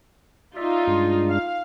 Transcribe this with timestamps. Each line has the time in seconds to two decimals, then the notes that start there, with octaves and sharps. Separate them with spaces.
0.56 D#4 F4 D5 E5
0.87 G2 G#3 D4
1.29 F5